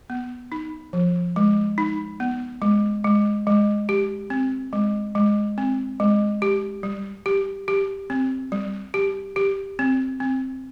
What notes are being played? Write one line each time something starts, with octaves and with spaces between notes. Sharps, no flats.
B3
D#4
F3
G#3
D#4
B3
G#3
G#3
G#3
G4
C4
G#3
G#3
C4
G#3
G4
G3
G4
G4
C4
G3
G4
G4
C4
C4